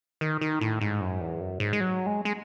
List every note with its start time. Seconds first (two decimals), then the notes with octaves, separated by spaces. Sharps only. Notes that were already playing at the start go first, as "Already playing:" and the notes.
0.21 D#3
0.41 D#3
0.61 A2
0.81 G#2
1.01 F#2
1.21 E2
1.40 F#2
1.60 G#2
1.73 G#3
1.80 F#3
2.06 G#3
2.25 G#3